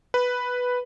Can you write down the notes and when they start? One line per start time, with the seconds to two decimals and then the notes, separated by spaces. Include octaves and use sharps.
0.14 B4